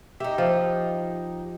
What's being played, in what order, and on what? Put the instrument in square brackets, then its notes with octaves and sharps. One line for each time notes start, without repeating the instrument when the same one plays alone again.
[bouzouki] D#4 G4 [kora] E5
[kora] F3